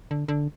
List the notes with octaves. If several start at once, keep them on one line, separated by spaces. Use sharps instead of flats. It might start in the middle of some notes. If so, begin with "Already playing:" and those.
D3
D3